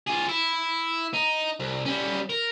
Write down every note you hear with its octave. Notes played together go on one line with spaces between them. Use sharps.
F4 G#4
E4
D#4
C2
G3 C#4
A#4